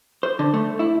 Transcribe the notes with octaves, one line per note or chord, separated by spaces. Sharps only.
C5
D3
A3
E4